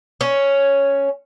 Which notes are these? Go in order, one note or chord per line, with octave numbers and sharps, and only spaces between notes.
C#4